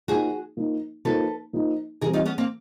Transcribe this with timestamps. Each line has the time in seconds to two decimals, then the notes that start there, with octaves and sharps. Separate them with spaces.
0.08 F3 A#3 D#4 F#4 G#4
0.57 F3 A#3 D#4
1.05 F3 A#3 D#4 A4 B4
1.53 F3 A#3 D#4
2.01 E3 G3 C4 G#4 A#4
2.13 D#4 F4
2.26 B3 C#4
2.38 A#3 C4